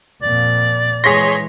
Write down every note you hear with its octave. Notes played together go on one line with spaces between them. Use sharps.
F2 A#2 D5
E3 G#3 G#4 C#5 C6 A#6 B6